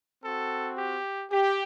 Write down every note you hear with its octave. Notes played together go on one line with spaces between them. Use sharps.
C4 F#4 A4
G4
G4